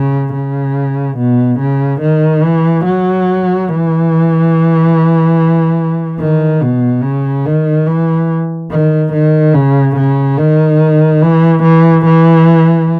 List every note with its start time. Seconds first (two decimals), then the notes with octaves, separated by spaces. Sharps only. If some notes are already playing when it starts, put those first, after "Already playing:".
Already playing: C#3
0.33 C#3
1.17 B2
1.59 C#3
2.01 D#3
2.43 E3
2.85 F#3
3.69 E3
6.20 D#3
6.62 B2
7.03 C#3
7.46 D#3
7.87 E3
8.71 D#3
9.13 D#3
9.54 C#3
9.96 C#3
10.38 D#3
11.22 E3
11.63 E3
12.06 E3